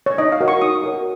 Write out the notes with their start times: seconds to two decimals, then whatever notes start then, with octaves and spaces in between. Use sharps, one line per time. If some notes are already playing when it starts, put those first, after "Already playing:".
0.06 C#5
0.18 D#4 D#5
0.32 F5
0.41 F#4 A#4 C#5
0.48 C#6
0.62 D#4 D#6
0.84 F#4 A#4 C#5